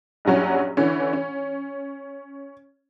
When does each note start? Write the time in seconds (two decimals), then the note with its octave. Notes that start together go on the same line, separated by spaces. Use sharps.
0.25 A#1 G2 F#3 C#4
0.77 D3 E3 C#4
1.13 C#4